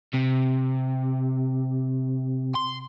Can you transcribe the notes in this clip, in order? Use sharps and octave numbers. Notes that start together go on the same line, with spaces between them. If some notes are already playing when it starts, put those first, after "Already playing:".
C3
C6